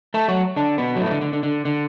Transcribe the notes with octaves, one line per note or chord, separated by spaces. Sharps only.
A3 A4
F#3 F#4
D3 D4
B2 B3
F#3
A2 A3
E3
D3
D3
D3
D3
D3